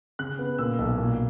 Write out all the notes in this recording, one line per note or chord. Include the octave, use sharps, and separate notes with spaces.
C#3 F#6
B3
A#2 E6
B1
A#2